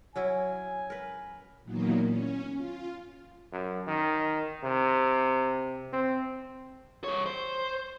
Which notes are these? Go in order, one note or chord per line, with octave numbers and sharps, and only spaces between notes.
F#3 C#4 E4 G#5
A#4 B4
A#2 D#3 E3 F#3 A#3 B3
C#4
F4
F#2
D#3
C3
C4
G3 C#5
C5